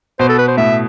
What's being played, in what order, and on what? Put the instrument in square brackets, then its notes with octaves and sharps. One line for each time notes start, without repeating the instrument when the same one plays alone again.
[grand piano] B2 [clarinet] C5
[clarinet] A4
B4
C5
[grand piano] A2 [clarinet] E5